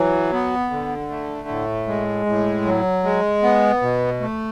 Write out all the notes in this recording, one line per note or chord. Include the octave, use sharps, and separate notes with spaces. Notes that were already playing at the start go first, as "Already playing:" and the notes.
Already playing: E3 F#3
B3
D3
A3
A2
G#3
A2
F#3
G#3
B3
B2
A3